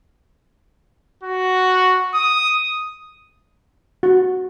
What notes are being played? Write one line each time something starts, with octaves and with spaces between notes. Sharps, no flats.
F#4
D#6
F#4